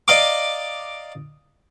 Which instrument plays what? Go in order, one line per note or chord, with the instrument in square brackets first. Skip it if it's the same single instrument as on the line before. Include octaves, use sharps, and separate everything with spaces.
[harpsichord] D5 D#5 F5 A#5 D6